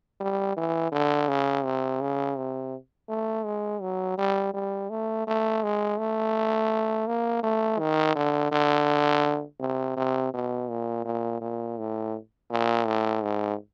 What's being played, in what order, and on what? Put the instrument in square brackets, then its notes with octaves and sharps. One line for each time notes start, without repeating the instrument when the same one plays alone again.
[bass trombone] G3
E3
D3
C#3
C3
C#3
C3
A3
G#3
F#3
G3
G3
A3
A3
G#3
A3
A#3
A3
D#3
D3
D3
C3
C3
B2
A#2
A#2
A#2
A2
A#2
A2
G#2